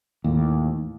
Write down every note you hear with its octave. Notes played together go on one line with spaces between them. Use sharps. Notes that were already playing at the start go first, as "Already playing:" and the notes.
D#2 A2